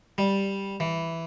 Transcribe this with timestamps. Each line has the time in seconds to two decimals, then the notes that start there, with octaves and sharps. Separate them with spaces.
0.18 G3
0.80 E3